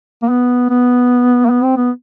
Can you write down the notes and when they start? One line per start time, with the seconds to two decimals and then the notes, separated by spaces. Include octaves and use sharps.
0.22 A#3
0.29 B3
0.69 B3
1.45 A#3
1.50 B3
1.63 C4
1.76 B3